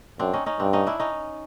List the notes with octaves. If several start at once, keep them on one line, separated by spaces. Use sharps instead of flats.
F#2 C4 D4
C#4 D#4
C#4 D#4
G2 C4 D4
C#4 D#4
D4 E4
C#4 D#4